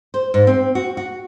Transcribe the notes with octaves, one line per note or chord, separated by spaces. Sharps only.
C5
G#2
C4
F#4
F#4